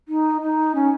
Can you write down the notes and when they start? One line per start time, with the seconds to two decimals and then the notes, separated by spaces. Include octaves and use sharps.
0.08 D#4
0.42 D#4
0.75 C#4